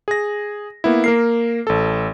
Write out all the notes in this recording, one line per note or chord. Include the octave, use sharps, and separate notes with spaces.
G#4 A#6
A#3 B3 E4
A#3 A#4 C7
A1 A4